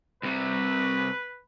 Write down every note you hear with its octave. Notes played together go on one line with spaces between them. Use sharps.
C2 C3 B4